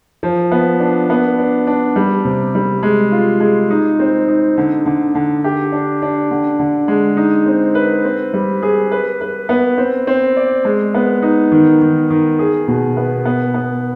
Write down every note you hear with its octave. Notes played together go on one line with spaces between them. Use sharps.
F3
B3
D4
B3
D4
D4
G3
C3
G3
G#3
F4
G#3
D#4
C4
D#4
D3
D3
D3
G4
D4
D4
D3
D3
G#3
D#4
C4
B4
C4
G3
G#4
B4
B4
B3
C4
C4
D5
G#3
B3
D#4
D#3
D#3
D#3
G#4
B2
B3
B3
B3